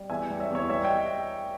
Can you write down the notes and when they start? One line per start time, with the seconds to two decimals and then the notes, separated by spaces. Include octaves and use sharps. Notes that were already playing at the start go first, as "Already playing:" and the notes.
Already playing: G3
0.10 E2 E5 G#5
0.30 G3
0.40 C#5 E5
0.50 E2 C#5 E5
0.70 G3 C#5 E5
0.84 D#5 G5